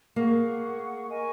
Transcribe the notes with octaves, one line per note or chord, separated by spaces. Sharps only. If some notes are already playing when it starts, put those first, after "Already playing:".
A#3 G#4 F#5 C#6
A#4 D#5 G#5 C#6